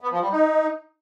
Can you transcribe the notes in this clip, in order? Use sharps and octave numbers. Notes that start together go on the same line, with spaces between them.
B3
F3
G3
D#4